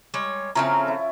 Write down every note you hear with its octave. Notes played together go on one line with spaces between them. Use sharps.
G3 G#3 C#5
C#3 F3 A3 C4 C#4 E4 A#5 F6
E4 F4 E5